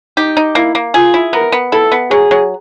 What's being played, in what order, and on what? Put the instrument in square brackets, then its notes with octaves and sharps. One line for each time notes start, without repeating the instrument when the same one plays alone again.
[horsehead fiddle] D#4 [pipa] G4
[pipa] D#4
[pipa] A#3 [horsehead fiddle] E4
[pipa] A#3
[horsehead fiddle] F4 [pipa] G#4
[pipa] E4
[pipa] B3 [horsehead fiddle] A#4
[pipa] B3
[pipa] E4 [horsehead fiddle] A4
[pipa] B3
[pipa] F#3 [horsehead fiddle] G#4
[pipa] F#3